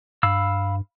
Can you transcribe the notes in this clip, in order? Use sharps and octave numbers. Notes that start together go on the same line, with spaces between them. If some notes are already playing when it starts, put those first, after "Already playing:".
G2 F5 B5 E6